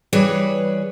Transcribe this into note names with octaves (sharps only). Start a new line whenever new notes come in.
E3 G3 G#4 B4 C#5